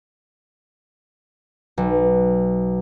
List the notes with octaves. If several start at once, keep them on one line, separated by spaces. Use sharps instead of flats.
B1